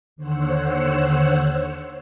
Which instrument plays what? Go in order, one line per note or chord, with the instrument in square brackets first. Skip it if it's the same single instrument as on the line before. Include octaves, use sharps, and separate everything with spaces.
[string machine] D#2 D3 C5 C#5 F#5 E6